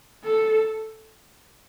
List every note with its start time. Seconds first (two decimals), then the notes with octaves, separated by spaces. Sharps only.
0.24 A4